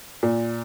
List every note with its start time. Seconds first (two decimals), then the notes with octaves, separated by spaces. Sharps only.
0.23 A#2